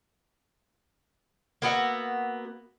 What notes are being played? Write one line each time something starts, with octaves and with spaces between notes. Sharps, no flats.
A#3 B3 F#4 E5